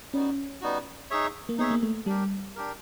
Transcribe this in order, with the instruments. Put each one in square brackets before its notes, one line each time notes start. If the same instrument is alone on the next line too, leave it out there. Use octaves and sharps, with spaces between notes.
[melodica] G3 B3 D#4 F#4 [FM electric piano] C#4
[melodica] G3 B3 D#4 F#4
D#4 G#4 C#5 E5
[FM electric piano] A#3
[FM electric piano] B3 [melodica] D#4 G#4 C#5 E5
[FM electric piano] A#3
A3
[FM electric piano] G3 [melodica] D4 G4 A#4
[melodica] D4 G4 A#4